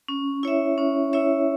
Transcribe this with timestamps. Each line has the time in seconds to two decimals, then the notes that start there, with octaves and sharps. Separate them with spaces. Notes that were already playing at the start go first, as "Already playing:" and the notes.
0.08 C#4
0.43 E4 C#5 E5
0.78 C#4
1.13 E4 C#5 E5